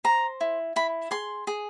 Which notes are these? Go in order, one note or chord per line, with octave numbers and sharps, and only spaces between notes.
C5 A#5
E4
E4 B5
G#4 C6
G#4